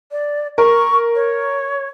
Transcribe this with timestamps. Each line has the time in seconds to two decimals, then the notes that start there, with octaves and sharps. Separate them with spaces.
0.12 D5
0.58 A#4 C#6
1.15 C#5